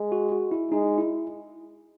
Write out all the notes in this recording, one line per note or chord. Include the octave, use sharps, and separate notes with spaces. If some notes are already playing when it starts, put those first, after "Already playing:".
Already playing: G#3
F#4
F#4
E4
G#3 D#4
E4